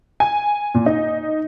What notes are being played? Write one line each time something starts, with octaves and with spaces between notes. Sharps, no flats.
G#5
A#2
D#4